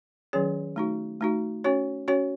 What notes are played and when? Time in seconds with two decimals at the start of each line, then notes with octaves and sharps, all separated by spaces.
0.33 D#3 F#3 C#4 G#4 C#5
0.76 A3 D#4 F#4
1.21 A3 D#4 F#4
1.64 C#4 F#4 C#5
2.08 C#4 F#4 C#5